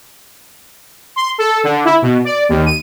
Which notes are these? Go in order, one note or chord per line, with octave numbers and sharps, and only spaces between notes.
C6
A4
D3
E4
B2
D5
D#2
D#7